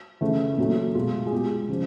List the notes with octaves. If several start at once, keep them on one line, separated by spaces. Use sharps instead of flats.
C#3 E3 A3
A#2 F#3 A3
B2 G#3 F4
G#4
B2 G#3 G4
C#3 F3